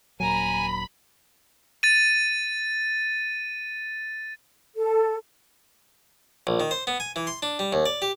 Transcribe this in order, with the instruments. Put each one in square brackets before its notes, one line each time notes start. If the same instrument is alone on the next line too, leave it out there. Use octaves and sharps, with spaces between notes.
[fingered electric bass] D#1 A#2 F#3 [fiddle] A#4 A#5 [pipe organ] G#5 [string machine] B5
[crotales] A6 D#7
[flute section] A4
[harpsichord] A#1
D#3
C5
B3
G#5
E3
C6
D4
G3
D#2
D5
G4